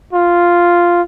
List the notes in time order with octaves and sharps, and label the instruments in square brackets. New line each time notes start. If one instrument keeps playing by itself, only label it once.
[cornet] F4